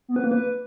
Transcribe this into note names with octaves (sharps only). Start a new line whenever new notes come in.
B3
B4
A#3
B4